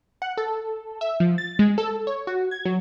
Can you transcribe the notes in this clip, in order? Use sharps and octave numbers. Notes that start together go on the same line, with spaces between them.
F#5
A4
E5
F3
A6
G#3
A4
C#5
F#4
G#6
F#3